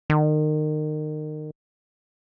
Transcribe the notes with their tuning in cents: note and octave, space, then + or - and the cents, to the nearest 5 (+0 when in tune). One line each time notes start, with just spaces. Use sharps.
D#3 -30